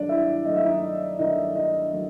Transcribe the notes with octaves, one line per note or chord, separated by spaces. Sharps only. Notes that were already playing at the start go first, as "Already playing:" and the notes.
Already playing: G2 D#3 F#3 A3 D4 D5
E4 E5
G2 D#3 F#3 A3 D#5
E5
D#4 D#5
G2 D#3 F#3 A3 D#4 D#5
D#4 D#5
D#3 F#3 A3